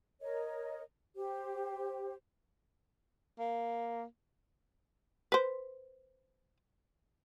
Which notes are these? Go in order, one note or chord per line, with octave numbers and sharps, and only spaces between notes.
A#4 C#5 D#5
G4 C5
A#3
B4 C5